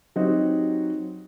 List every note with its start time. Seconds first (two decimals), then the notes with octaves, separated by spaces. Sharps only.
0.16 F#3 C4 D#4 F#4 G4